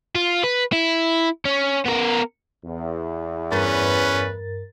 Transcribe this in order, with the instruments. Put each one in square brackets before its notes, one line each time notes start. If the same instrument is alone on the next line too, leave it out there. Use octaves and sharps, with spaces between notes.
[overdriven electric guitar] F4
B4
E4
C#4
B3 A#4
[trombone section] E2
[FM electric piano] G2 A#4 A6 [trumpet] C#4 [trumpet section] B4